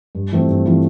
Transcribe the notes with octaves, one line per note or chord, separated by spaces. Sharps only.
G2
E3 A3 C4 F4
G2
E3 A3 C4 F4